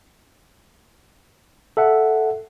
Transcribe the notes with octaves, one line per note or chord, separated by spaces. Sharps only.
A4 E5 F#5